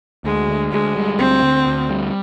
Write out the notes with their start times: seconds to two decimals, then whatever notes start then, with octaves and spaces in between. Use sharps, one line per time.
0.24 D2 G#3
0.49 D3
0.72 D2 G#3
0.96 G3
1.19 D2 C4
1.43 D3
1.67 D2
1.90 G3